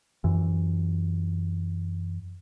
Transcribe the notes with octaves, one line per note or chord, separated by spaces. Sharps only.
F#2 E3